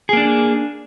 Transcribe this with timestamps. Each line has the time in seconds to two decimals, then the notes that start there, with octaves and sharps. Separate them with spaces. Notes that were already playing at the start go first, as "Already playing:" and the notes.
0.09 G#4
0.13 A#3
0.17 D4